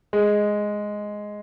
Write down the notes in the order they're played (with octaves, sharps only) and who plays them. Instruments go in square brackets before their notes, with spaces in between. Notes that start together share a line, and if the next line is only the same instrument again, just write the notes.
[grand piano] G#3